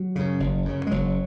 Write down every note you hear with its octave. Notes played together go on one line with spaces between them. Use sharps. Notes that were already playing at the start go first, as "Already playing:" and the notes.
Already playing: F#3
F#2 C#3
F#1
F#2 C#3
G#3
F#1 F#3